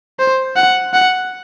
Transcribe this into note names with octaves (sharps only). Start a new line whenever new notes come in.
C5
F#5
F#5